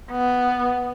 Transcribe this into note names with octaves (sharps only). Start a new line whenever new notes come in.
B3